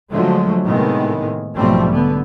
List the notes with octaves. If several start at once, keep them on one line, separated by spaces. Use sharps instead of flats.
D3 F3 F#3 G#3 A3
A2 C3 D#3 G#3 B3
B1 G#2 F3 G3 A3 C4
D3 B3